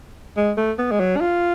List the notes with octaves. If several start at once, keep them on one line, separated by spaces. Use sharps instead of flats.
G#3
A3
B3
G#3
F#3
D4
F4